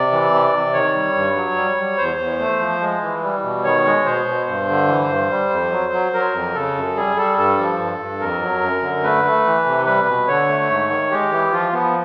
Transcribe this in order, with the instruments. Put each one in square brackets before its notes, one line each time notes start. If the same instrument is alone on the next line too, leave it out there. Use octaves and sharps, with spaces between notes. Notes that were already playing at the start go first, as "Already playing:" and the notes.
Already playing: [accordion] C3 D5
E3
C3
C3
D#3 C#5
G3
G2
F#3
G3
G3
E2 C5
E2
A3
F3
G#3
E3
G3
B2
D#3 C#5
G#3
B2 C5
B2
G2 C5
D3
E3
G2
G3
F2
F#3
F#3
F#3 A#4
F2
C#3 A4
F#2
G3 G#4
G3 A4
G2 A4
F3
G2
G2
F2 A#4
F#3
F#2
D3
A3 B4
A3
E3
C3
G3 B4
B2
D3 C#5
A3
G#2
D#3
G#3 G4
E3
F3 F4
F3 B3